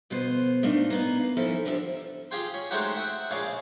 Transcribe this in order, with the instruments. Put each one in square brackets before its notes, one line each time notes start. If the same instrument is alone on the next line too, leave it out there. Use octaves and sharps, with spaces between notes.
[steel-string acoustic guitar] D2 B2 F3 B3 C5
A#2 A3 A#3 D4 D#4
A#3 B3 D#4
F5
F3 C#4 D#4 E4 A4 E5
D#2 D3 F3 G4 G#4 E5
[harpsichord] F4 G4 G#4 G5 C6
C#4
G#3 A3 C4 D#4 F#4 G4
E5 F#5 G5 D#6
A#1 C#3 G#4 D5 F5